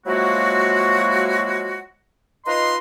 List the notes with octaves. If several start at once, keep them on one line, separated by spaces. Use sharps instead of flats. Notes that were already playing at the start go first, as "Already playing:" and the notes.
F3 F#3 G#3 A#3 E4 F#4
D#4 F4 B4 D#5 A#5 C6